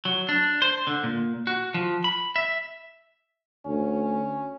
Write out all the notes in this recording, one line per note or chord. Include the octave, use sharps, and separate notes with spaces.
F#3
D4
C5
D3
A#2
F#4
F3
B5
E5
D2 C#4